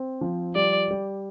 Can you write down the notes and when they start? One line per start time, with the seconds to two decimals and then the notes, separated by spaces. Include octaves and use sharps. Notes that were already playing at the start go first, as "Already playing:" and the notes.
Already playing: C4
0.21 F3
0.55 G3 D5
0.91 G3